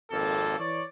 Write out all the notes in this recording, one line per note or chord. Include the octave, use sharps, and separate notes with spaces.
G#1 F2 A#3 A4
E3 C#5 D5